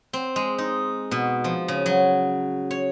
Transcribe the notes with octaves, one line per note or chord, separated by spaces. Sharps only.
C4
G#3
D#4
B2
F3
C#3
F#3
C#5